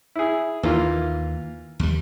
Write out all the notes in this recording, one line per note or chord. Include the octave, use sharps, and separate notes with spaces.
E4 G#4
D#2 E3 A#3 F4
D#2 G3